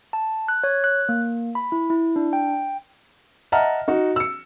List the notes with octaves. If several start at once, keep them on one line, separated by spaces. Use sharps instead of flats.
A5
F#6
C#5
F#6
A#3
B5
E4
E4
D4
G5
D#5 E5 F#5 A5 A#5 F6
D#4 F#4
E6 C#7